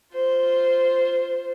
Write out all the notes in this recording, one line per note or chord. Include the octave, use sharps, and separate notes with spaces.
F4 C5